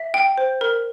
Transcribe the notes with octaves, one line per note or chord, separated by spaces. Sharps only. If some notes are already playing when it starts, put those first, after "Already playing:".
Already playing: E5
G5
C5
A#4